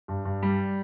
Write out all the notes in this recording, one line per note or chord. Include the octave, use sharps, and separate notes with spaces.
G2
G2
G3